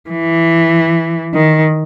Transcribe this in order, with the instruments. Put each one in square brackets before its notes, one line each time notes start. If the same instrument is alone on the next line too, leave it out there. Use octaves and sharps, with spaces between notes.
[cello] E3
D#3